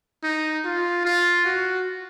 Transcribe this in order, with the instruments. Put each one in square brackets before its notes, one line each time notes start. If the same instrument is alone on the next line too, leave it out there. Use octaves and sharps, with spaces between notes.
[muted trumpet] D#4
F4
F4
F#4